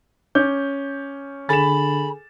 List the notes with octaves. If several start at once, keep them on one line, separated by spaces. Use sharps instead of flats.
C#4 D6 G6
D3 G#4 A4 G#5 B5 A6 E7